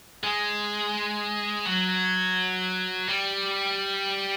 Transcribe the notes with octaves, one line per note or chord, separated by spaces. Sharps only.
G#3
F#3
G3